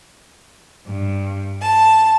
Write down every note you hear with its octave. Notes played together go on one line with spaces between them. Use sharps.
G2
A5